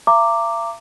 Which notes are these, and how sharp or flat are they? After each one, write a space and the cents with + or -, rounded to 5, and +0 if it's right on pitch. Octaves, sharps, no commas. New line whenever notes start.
E5 +45 A#5 -20 D6 +0